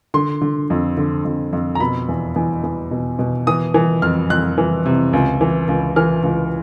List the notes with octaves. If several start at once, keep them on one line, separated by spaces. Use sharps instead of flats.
D3 C6
D3
F2
D3
F2
F2
A#5
B2 B5
E2
E2
E2
B2
B2
E3 D#6
E3
F2 F6
F2 F#6
E3
C3
C#2
E3
C#2
E3 F6
C#2